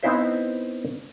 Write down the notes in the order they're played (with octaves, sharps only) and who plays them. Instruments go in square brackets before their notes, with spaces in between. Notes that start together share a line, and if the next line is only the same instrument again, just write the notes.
[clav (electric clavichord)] B3 C4 D#4 E4 C5 E5